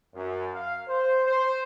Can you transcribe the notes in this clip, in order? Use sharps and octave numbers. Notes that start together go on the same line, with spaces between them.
F#2
F5
C5
C5